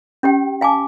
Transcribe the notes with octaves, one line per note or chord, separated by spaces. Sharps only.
C#4 G4 G5
F5 G#5 A5 D6